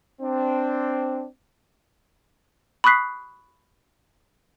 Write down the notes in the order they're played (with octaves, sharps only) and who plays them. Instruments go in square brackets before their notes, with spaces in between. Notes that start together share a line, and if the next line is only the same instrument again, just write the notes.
[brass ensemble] C4 D4
[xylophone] B5 C#6 D#6 F#6 B6 C7